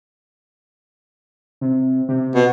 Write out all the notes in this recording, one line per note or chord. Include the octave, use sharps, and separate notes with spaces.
C3
C3
B2